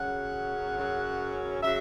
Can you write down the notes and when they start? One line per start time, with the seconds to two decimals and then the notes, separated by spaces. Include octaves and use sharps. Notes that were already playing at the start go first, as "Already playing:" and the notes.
Already playing: F#2 C#3 F#3 C#4 F#5
0.77 F#2 C#3 F#3 C#4
1.63 C#3 F#3 E5